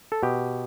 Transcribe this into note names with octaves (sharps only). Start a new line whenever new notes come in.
A4
B2 G4